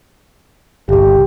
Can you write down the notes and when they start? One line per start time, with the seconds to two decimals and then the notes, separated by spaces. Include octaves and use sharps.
0.89 G1 C2 G4